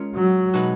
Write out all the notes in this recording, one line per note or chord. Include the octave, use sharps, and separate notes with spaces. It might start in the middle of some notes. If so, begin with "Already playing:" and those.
Already playing: G#3 C#4 F4 A#4
F#3
B2 G#3 D#4 F#4 B4